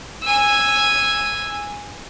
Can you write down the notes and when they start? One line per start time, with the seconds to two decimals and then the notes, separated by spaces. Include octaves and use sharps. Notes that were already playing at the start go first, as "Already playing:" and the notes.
0.23 G#5 E6